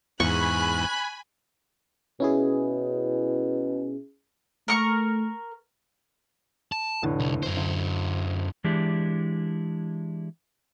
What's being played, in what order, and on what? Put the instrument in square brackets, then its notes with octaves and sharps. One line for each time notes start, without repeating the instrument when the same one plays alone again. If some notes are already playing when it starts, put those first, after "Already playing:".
[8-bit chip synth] E2 G#2 [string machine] G#5 B5 [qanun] C#6 [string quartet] F#6
[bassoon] B2 [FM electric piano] C#4 E4 G#4
[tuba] A3 [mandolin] A#4 C#6
[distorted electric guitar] A5
[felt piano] F1 A2 D3
[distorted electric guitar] C2
F#2 C5
[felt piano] D2
[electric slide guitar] E3 G#3 D4 E4 G4